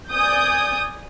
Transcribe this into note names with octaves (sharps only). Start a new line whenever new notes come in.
D5 G#5 D#6 G6